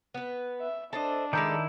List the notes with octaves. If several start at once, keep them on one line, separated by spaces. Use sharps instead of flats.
B3 B4
E5
D4 A4 C5 D#5
D#3 G#3 E4 A4 D5 A5 A#5 G6